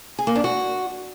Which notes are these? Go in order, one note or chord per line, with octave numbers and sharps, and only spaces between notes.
G#4
A#3
D4
F#4